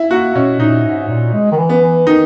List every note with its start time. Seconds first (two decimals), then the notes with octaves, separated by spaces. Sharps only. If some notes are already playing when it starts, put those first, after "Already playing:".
Already playing: E4
0.11 A#3 F#4
0.35 B2 C#4
0.60 A#2 D#4
0.85 G#2
1.09 A#2
1.33 G#3
1.52 D#3
1.58 E3
1.69 B3
1.82 E3
2.07 D#3 D#4